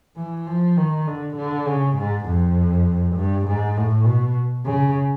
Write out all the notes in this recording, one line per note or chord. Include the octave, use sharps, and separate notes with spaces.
E3
F3
D#3
D3
D3
C#3
G#2
F2
G2
G#2
A2
B2
C#3